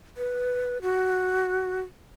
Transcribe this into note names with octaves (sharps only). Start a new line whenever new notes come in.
B4
F#4